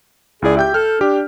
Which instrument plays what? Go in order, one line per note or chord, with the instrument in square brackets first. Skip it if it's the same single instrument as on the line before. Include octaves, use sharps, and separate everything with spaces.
[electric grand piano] C#2 E4 D5 [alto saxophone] G#4
[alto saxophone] G4 [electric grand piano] E5 G5 G6
[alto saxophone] A4 [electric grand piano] F6
[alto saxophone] D4 [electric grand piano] G4 G5